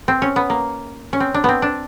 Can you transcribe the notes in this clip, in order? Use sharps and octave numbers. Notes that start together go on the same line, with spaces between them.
C4
C#4
B3
A#3
C#4
C4
D4
B3 C4
D4